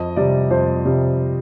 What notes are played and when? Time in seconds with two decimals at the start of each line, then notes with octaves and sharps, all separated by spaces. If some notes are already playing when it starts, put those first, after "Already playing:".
Already playing: F2 D#5
0.16 C3 G3 D5
0.51 F2 C5
0.85 C3 G3